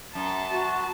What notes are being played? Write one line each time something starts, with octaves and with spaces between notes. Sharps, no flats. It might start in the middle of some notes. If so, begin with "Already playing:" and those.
F#2 A5
F#4